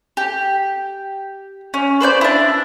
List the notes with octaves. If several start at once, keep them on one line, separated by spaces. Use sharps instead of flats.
G4
C#4
B4 C5 D5 G6
D4 E4